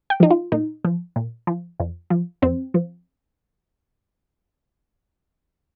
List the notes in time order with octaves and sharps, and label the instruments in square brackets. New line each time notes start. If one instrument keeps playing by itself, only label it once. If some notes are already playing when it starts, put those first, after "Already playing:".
[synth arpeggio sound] G5
F3 D#4
F4
A#2 D#4
F3
A#2
F3
F2
F3
F2 C4
F3